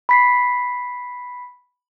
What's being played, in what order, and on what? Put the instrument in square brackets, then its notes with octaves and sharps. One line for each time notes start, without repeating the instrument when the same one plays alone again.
[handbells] B5 B6 C7